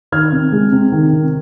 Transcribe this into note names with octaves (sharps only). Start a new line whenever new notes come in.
D#3 F6 G#6
C3
G#3
C3
D#3
C3